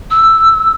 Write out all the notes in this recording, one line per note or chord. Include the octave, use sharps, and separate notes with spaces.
E6